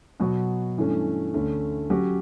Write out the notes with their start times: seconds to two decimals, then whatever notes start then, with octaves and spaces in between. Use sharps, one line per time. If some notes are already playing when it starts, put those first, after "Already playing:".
0.20 B2 F#3 B3 F#4
0.77 G2 E3 A3 C#4
1.34 D2 D3 A3 C#4
1.90 F#3 C#4 G4